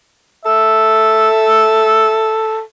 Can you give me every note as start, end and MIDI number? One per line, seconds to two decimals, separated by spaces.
0.45 2.60 69
0.45 2.35 76